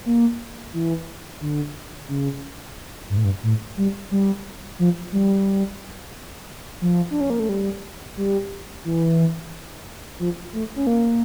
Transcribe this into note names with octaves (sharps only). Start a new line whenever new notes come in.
A#3
E3
D3
C#3
G2
A2
G2
A2
G3
G3
F3
G3
F3
D4
C#4
A#3
A3
G3
G3
E3
F3
A3
C#4
A#3